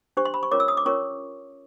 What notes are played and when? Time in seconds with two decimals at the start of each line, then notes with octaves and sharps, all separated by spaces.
0.17 D4 G4 C5 C#6
0.25 C6
0.34 B5
0.43 C#6
0.51 C#4 F4 A#4 C#5 D6
0.60 E6
0.68 D#6
0.77 D6
0.86 C#4 F4 A#4 C#5 C#6